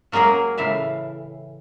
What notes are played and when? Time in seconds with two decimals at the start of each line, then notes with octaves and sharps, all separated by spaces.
0.12 F#3 A#3 C#4 G#4 A#4
0.58 A2 C#3 E3 E5 F5